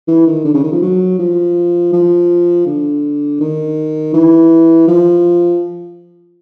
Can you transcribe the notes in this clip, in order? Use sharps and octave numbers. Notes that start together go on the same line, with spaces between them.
E3
D#3
D3
C#3
D#3
F3
F#3
F3
F3
D3
D#3
E3
F3